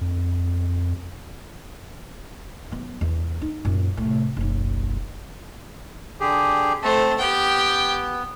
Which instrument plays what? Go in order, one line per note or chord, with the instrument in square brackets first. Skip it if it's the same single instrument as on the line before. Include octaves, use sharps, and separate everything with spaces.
[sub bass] F2
[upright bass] F#3 B3
E2
D#4
F#2 A#2
A2 C3
F#1 B1
[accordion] D3 G4 G#4
[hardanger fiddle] A3 C5 [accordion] C4 A5
[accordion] B3 [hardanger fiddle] G4 G5